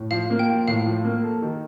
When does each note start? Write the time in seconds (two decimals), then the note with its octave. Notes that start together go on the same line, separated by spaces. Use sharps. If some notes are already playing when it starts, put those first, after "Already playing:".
Already playing: A2
0.11 F3 F5
0.30 A#3
0.39 G5
0.49 F4
0.68 A2 F5
0.86 F3
1.05 A#3
1.24 A4
1.42 D#3